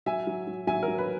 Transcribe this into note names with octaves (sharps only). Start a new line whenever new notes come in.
F#3 E5 G#5
F#3
F#3
F#3 E5 G#5
A#4
F#3
B4